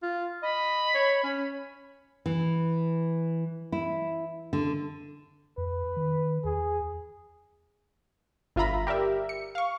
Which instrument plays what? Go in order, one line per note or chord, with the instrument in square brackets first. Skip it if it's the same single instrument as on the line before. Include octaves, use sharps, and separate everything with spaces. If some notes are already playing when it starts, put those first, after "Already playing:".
[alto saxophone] F4
[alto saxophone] D#5 [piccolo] B5
[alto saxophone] C#5
C#4
[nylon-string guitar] E3
E4
D3
[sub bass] F2 [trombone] B4
[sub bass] D#3
[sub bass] E2 [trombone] G#4
[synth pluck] G1 F4 E5 A#5 B5
G4 A#4 D5 E5
C#7
F5 C#6